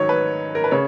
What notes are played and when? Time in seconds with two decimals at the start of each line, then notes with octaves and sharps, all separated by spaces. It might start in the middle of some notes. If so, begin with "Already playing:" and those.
Already playing: G#2 D#3 F#3 C#5
0.09 B4
0.55 A#4
0.64 B4
0.71 C#3 C#5